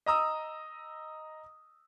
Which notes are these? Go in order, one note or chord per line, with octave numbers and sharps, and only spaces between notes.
D#5 A#5 D#6 E6